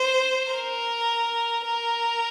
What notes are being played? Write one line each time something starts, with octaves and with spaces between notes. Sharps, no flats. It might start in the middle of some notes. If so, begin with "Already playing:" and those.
Already playing: C5
A#4
A#4